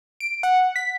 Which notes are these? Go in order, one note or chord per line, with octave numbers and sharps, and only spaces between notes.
D7
F#5
B6